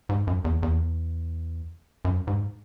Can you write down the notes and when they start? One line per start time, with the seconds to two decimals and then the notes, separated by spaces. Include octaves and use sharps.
0.09 G#2
0.27 F#2
0.45 E2
0.63 E2
2.05 F#2
2.27 G#2